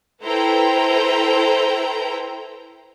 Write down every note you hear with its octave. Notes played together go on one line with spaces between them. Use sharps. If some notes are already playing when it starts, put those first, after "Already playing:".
E4 A4 B4 C5 G5 A#5